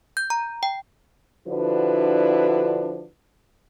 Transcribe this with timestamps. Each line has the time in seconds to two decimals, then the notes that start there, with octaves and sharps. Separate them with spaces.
0.17 G6
0.30 A#5
0.63 G5
1.47 D3 F3 D4 E4 F#4 B4